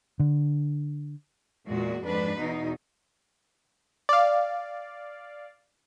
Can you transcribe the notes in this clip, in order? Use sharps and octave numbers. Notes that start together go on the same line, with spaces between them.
D3
E2 A#2 G#3 F#4
F2 G#2 D4 B4
E2 B2 D#4
D5 F5